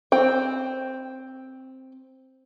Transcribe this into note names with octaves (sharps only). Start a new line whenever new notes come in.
C4 G5